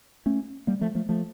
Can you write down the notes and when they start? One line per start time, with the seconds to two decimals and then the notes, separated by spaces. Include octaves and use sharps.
0.26 A3 C#4
0.67 G3 A#3
0.81 F3 A3
0.95 F3 A3
1.09 F3 A3